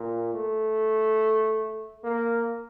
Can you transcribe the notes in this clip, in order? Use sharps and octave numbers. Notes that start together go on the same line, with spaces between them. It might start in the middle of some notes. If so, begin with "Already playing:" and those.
Already playing: A#2
A3
A#3